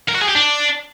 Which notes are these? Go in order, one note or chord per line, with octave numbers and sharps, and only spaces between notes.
A#4
F#4
G#4
G4
D4